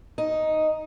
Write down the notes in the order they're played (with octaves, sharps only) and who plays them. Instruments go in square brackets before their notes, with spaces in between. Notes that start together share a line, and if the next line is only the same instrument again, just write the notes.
[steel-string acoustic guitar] D#4